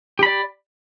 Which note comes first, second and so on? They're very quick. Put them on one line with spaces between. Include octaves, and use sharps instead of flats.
G4 B5 D5